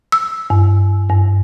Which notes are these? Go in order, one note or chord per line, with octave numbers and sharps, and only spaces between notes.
E6
G2
G2